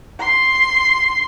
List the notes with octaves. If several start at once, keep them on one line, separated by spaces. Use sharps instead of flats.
C6